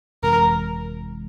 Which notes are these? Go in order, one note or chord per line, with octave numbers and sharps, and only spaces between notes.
G1 F2 C3 E3 G#3 A#4